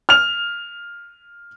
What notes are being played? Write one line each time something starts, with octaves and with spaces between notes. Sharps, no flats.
F6 F7